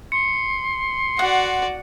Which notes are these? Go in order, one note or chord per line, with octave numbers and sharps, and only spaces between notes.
C6 C#7
F#4 D5 F#5